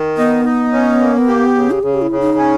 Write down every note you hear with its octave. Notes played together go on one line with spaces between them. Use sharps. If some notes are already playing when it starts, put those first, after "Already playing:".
Already playing: D#3
B3 D#4
D#4
C#4
A#3
G4
C#3
G4
C#3 G#4
G4
E4
C#3
D#4
C#4